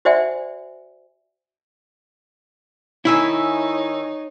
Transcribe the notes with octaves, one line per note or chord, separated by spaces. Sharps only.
F#4 C5 D5 E5 F#5 G#5
D#3 D#4 E4 C#5 E5 G#5